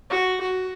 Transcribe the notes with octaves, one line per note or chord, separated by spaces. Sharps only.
F#4
F#4